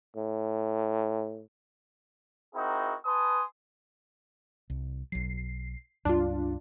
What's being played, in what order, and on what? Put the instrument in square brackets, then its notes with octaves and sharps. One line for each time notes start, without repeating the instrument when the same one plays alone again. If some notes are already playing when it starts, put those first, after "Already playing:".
[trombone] A2
[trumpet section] C4 D#4 E4 F#4 G#4 A#4
B4 G#5 A5 C6 D#6
[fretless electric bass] C2
[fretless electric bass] B1 F#3 [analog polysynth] C7
[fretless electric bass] C#2 G2 G3 [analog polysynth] D4 F4